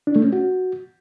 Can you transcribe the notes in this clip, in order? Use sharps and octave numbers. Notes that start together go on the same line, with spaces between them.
D4
A3
C#4
F#4